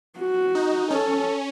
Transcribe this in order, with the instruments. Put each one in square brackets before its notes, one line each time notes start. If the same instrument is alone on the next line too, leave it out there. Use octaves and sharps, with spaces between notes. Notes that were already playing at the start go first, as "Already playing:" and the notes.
[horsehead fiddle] F#4
[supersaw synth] D#4
[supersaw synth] C#4 [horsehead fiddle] A4